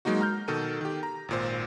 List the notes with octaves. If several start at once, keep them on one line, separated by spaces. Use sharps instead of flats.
F#3 G#3 A#3 D#4 F#4
A#5 F6 G6
B2 D#3 A4 A#4 D#7
D#3 G4
A#5
G#1 A#2 C5